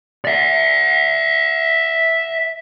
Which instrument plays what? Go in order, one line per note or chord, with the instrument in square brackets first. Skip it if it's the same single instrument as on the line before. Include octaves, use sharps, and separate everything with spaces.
[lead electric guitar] D5 E5